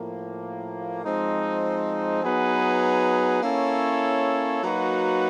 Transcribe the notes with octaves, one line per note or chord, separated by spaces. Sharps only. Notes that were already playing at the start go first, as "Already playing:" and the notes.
Already playing: A2 F3 A#3
F3 G#3 C4 D#4
F#3 B3 D#4 G#4 B4
A#3 C#4 E4 A4 C#5
F#3 A#3 D#4 F#4 B4